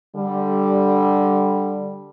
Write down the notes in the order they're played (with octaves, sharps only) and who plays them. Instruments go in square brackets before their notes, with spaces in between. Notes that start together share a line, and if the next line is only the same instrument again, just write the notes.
[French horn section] D3 G3